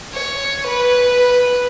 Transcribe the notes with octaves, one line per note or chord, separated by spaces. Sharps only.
C#5
B4